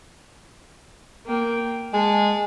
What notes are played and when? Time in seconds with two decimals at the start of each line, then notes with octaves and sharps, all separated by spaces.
1.26 A#3 G5
1.94 G#3 A5